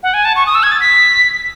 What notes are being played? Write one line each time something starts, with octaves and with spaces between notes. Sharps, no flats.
F#5
G#5
A5
C#6
D#6
E6
G#6
A6
B6